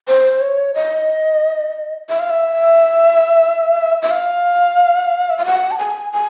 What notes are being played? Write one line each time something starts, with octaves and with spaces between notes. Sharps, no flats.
C5
C#5
D#5
E5
F5
E5
E5
F5
E5
F5
F#5
A5
G#5
G#5